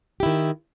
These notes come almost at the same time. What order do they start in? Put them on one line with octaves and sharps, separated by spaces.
G4 E4 D#3